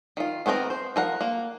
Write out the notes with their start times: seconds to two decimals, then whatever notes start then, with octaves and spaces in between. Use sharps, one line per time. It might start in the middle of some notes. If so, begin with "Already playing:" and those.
0.17 D#3 F4
0.46 D#3 B3 C4 D#4 A#4
0.70 C5
0.96 F3 A#4 F#5
1.21 A#3